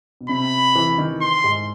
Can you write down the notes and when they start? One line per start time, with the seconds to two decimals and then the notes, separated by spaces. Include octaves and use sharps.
0.21 B2
0.29 C3 B5
0.75 E3
0.98 D#3
1.21 C6
1.44 G#2